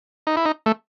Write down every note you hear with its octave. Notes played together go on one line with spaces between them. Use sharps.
D#4
E4
D#4
A3